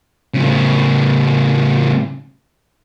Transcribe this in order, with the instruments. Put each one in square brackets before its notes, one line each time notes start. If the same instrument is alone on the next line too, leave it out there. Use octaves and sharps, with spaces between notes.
[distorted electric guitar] A2 C#3